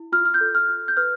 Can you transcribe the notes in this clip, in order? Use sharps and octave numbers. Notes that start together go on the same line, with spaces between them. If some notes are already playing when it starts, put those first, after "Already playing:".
Already playing: E4
F4 F6
F6
G6
A4
F6
F4
G6
B4 F6